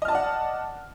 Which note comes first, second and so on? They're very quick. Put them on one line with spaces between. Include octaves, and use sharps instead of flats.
D#5 F6 A5 D5 F#5